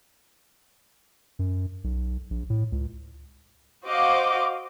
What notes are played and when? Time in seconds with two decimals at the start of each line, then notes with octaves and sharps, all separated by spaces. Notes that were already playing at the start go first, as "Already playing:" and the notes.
1.39 F#2
1.84 B1
2.30 A#1
2.50 A2
2.72 C#2
3.86 F#4 C5 D#5 F5 D6